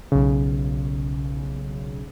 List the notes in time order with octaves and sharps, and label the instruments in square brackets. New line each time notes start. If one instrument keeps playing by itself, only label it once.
[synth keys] B1 C#3